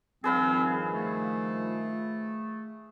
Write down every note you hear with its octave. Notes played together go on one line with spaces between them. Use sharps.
G2 D#3 F3 C4 G#4 B4 F5
A3